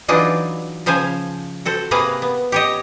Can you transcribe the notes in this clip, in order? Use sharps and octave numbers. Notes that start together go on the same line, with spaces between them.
E3 F#3 D4 D#4 F4 G#4
C#3 F3 C5 F5 G#5
F#4 A4 C5
C3 A#3 G#4 B4 F5 A#5
B3
G4 C#5 D#5